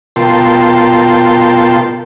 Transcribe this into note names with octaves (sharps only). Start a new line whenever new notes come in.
B2 F4 A#4 G5 A5 C6